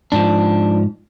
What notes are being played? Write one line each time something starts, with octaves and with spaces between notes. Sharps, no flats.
G#2 F3 D4